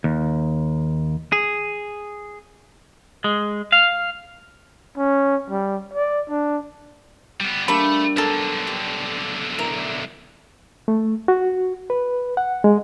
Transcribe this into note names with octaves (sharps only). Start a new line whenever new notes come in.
D#2
G#4
G#3
F5
C#4
G3
D5
D4
G3 B3
G3 A3 A#3 D4 B5
B1 D3 A4 A#4
G4
E4 A#4
A3
F#4
B4
F#5
G#3